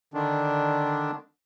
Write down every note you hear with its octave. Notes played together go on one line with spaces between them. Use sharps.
D3 D#3 D4